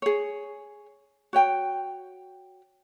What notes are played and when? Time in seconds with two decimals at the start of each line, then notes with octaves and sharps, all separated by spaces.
0.02 G#4 C#5
1.33 F#4 C#5 G5